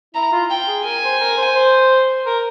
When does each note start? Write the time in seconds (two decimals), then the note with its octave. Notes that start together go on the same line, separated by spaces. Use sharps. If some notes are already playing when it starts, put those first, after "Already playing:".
0.15 E4 A#5
0.32 F4
0.50 G5
0.68 G#4
0.84 A#4 G#5
1.03 C5
1.20 A#4
1.37 C5
1.55 C5
2.26 A#4